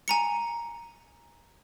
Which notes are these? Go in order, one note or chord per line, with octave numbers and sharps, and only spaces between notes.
G#5 A#5 C#7